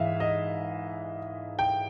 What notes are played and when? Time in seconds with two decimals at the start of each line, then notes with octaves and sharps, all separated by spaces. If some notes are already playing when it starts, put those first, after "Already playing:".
Already playing: G#2 E3 E5 F5
0.20 D#5
1.59 G5